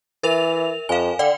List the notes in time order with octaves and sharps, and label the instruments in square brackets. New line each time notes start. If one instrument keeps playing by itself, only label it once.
[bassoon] E3 [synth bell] A#4 E5 F7
[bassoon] F2 [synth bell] F5 G#5
[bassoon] D3 [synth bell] D5 F#5 G5